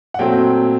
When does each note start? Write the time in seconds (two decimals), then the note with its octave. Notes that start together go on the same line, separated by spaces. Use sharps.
0.14 F#5
0.19 A#2 F#3 A3 C4 G5